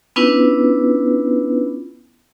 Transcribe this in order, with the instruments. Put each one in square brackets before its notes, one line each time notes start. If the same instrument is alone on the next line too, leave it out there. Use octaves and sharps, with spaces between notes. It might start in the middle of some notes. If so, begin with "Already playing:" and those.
[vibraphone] B3 C#4 D4 E4 F4 B4